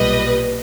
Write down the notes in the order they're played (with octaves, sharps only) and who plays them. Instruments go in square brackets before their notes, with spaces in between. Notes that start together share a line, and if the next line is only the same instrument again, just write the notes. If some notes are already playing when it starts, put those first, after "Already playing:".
Already playing: [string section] B1 A#2 G3 B4 D#5